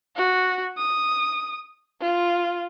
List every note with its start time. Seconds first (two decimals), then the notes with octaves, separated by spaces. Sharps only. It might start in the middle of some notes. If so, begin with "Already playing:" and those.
0.16 F#4
0.77 D#6
2.01 F4